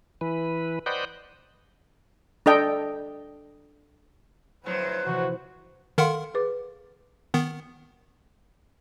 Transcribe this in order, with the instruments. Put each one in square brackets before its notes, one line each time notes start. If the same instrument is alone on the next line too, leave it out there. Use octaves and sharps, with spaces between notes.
[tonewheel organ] E3 B4
B4 C5 D5 D#5 F#5 G5
[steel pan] D4 A4 D#5 G5
[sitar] F2 A2 F#3 [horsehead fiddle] B4 C5
[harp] C3 E3 F3 [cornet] F#4
[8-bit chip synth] D#3 A#4 F#5 [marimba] A4 F5 C6
[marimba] G#4 B4 D6
[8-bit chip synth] D#3 B3